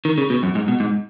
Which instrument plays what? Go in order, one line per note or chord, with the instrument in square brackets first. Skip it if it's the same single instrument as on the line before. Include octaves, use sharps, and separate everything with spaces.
[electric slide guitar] D#3
C#3
B2
F#2
G#2
B2
G#2